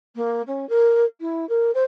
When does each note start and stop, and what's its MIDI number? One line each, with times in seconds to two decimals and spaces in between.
0.15 0.42 58
0.47 0.68 61
0.69 1.04 70
1.20 1.47 64
1.49 1.71 70
1.74 1.83 72